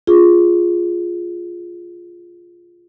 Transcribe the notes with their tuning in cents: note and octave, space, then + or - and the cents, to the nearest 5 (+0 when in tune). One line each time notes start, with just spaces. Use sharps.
F4 +0 G#4 +0